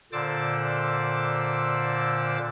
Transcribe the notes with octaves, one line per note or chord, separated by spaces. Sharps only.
A#2 D3 C5 D5 D6 E6